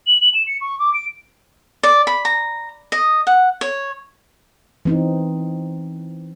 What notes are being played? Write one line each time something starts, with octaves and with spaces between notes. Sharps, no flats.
F#7
F#7
E7
C#7
C#6
D6
D7
D5
B5
A#5
D#5
F#5
C#5
E3 C4 D#4